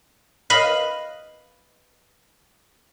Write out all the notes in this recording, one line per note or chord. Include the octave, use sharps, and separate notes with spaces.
B4 D#5 F5 B5